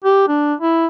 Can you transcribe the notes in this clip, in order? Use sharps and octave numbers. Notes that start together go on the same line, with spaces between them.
G4
D4
E4